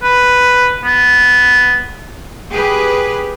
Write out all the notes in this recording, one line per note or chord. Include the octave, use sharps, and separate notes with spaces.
B4
B3
G4 G#4 B4